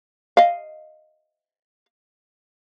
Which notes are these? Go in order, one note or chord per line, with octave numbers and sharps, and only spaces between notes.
D#5 F5